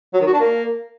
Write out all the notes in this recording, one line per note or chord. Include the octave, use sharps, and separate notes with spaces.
F#3
D#3
F#4
D4
A#3